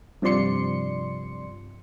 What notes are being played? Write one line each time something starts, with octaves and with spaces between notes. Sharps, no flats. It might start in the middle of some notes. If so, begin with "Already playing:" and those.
G2 C3 F3 D5 C6 C#7